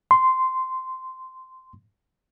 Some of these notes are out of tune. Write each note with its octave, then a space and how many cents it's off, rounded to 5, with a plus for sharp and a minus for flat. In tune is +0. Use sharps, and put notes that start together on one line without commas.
C6 -10